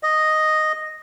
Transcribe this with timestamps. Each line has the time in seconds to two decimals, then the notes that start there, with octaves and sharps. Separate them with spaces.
0.03 D#5